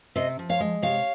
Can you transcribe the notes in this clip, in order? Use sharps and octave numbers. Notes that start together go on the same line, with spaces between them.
C3 C5 D#5
F3
C#5 F5
G#3
C3 C#5 F5